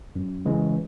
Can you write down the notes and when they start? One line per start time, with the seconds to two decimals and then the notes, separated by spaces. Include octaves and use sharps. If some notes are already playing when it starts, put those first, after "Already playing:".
0.16 F#2
0.45 C#3 E3 G#3 C#4